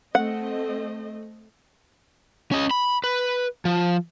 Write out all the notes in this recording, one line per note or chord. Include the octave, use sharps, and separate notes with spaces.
A3 C4 D#5 F#5
C#4 D#5
B5
B4
F3